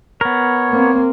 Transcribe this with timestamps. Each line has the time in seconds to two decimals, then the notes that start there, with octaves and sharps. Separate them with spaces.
0.21 B3 A#4 C#5
0.71 A#3 C4